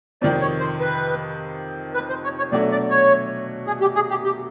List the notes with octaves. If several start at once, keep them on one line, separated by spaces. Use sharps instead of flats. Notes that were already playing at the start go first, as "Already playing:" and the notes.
F2 C3 D#3 D5
C#5
C5
B4
B4
C5
C#5
C#5
B2 F#3 A3 D4 F#4 D5
D5
C#5
G#4
G4
G#4
G4
G4